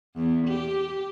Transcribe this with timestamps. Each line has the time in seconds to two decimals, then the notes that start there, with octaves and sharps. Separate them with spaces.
0.16 E2
0.48 G4